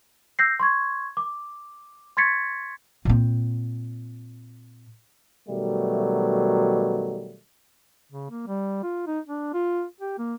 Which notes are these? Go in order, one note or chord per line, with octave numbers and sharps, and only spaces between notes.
E6 G6 A#6 C7
C6 C#6 G#6
D6
C6 C#6 G#6 A6 B6 C#7
A#2 C4
B2 D#3 F#3 G3 A3
C#3
A#3
G3
F4
D#4
D4
F4
G4
A#3